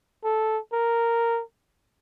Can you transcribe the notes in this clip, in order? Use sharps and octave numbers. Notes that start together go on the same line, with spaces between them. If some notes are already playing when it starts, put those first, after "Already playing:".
A4
A#4